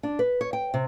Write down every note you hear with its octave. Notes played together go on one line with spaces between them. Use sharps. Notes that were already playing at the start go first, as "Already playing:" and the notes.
D4
B4
C#5
G5
C3